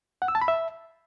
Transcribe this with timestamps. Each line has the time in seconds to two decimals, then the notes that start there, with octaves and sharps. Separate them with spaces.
0.22 F#5
0.28 E6
0.35 A5
0.42 B5
0.48 E5